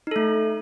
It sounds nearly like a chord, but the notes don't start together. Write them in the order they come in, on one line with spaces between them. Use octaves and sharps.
D#4 A4 A3